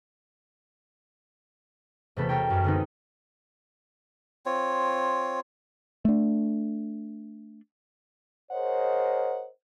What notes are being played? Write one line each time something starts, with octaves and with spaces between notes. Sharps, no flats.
E1 C3 A3 B3 A4 B5
A4 A#4 C#5 G5
F#2 G3
D3 G#3 B3 C4 D#4
C4 F4 C#5
A3 D4
G#4 A#4 C5 C#5 D#5 F#5